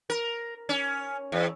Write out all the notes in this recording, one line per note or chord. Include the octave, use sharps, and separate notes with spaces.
A#4
C#4
E2